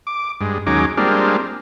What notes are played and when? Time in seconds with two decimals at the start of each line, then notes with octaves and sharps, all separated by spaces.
0.07 D6
0.41 G2 G#3
0.67 D#2 F#3 G#3 C#4 D#4 D6
0.97 G3 G#3 A#3 C4 D4 F4